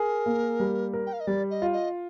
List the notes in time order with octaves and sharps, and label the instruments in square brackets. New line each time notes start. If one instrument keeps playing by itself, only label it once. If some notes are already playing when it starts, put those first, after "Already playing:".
Already playing: [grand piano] G#4 [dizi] A#4
[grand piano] A#3
G3
A#4
[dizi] G5
F5
D#5
[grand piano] G3 [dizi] D5
[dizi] D#5
[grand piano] F4
[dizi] D#5